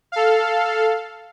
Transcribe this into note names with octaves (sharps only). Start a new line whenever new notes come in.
A4 F5